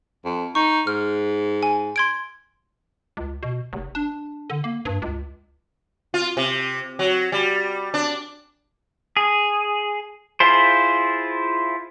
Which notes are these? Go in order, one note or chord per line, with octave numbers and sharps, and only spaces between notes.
F2
D#4 C#6
G#2 F6
G#5
C6 G#6 D7
C#2
B2
F1
D4
D3
A#3
G2
C#2
F4
C3
F#3
G3
D4
G#4
E4 F4 G#4 C5